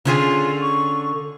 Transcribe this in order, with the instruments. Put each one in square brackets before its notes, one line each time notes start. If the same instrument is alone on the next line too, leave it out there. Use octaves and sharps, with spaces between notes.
[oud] D3 C#4 G#4 [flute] F4
[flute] C#6